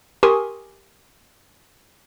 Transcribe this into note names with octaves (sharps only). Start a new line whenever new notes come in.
G4 A#4 G#5 C6 C#6 D#6